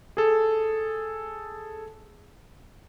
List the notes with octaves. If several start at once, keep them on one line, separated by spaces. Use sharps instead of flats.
G#4 A4